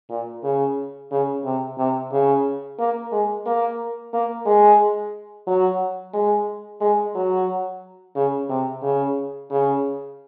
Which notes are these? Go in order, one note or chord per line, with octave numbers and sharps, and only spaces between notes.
A#2
C#3
C#3
C3
C3
C#3
A#3
G#3
A#3
A#3
G#3
F#3
G#3
G#3
F#3
C#3
C3
C#3
C#3